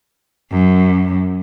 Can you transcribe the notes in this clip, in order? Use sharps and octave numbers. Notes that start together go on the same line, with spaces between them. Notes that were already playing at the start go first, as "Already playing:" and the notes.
F#2